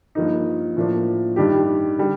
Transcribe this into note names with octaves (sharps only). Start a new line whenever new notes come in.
G2 F3 A#3 D#4
A2 F3 A#3 D4
G2 D#3 G3 D4 G4
D3 G3